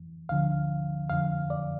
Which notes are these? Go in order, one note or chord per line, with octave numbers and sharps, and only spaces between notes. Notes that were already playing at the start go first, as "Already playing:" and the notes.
Already playing: F2 E3
D2 D3 F3 F5
F2 D3 F3 F5
D5